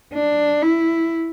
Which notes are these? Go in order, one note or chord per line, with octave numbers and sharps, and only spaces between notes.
D4
E4